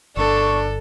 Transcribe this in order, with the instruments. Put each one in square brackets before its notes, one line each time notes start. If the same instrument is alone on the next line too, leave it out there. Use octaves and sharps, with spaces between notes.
[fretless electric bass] G1 [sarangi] D4 [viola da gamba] A4 [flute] C#6